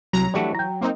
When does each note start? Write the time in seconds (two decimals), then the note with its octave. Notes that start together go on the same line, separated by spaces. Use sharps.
0.13 C2 F#3 A#5
0.34 E3 G3 A3 D4 F#4
0.55 G5 A#5
0.81 A#3 C4 D#4